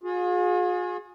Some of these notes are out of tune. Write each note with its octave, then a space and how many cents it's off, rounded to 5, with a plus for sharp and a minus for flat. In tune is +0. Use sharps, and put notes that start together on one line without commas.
F4 +45 G#4 +0